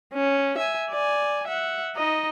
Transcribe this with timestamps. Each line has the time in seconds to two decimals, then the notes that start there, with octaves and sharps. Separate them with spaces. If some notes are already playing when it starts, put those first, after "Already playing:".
0.14 C#4
0.58 E5 G#5
0.90 D5 G#5
1.47 E5 F#5
1.96 D#4 D#5